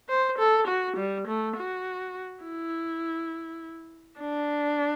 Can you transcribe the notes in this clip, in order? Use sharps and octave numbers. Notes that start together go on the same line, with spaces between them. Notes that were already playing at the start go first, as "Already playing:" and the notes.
C5
A4
F#4
G3
A3
F#4
E4
D4